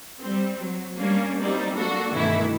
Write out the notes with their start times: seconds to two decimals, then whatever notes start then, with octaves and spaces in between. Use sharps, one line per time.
0.20 G3 C4
0.59 F#3
0.98 G3 A#3 C#4 D4
1.40 F#3 G3 A#3 C4 D#4 D5
1.76 A#3 D4 F#4 A4
2.13 G2 B2 D#3 E3 A3 E4